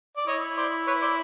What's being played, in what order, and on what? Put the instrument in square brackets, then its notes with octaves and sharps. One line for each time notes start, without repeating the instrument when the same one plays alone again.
[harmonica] D5
[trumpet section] E4 [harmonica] C#5 D#5
[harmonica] C5 D5
B4 C#5
C5 D5